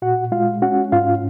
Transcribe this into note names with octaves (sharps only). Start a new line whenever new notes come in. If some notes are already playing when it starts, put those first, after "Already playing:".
A#2 F#4 F#5
G#3 F4 F5
C#4 F#4 F#5
G#2 F4 F5